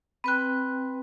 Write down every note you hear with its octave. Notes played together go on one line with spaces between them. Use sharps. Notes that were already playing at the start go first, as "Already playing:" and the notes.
C4 B4 G5 B5 F#6